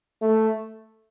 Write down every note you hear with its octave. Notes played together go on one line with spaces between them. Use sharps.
A3